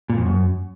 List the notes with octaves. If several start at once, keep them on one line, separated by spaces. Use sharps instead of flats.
A#2
F2
F#2